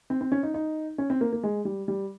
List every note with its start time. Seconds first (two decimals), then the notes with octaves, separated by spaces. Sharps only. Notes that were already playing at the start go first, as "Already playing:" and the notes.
0.10 C4
0.21 C4
0.32 C#4
0.43 D#4
0.54 D#4
0.98 C#4
1.10 C4
1.21 A#3
1.33 A#3
1.43 G#3
1.65 G3
1.88 G3